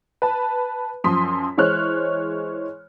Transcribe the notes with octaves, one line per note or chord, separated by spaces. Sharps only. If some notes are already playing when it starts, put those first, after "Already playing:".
B4 A5
F#2 F3 C6 D#6 B6
E3 G#3 C5 C#5 F6 F#6